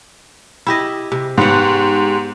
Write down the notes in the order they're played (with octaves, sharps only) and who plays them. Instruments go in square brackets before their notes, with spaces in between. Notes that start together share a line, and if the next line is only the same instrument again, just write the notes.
[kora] E4 G4 D#5
C3
[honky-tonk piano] G#2 [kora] B3 F#5 [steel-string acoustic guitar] G4 C#5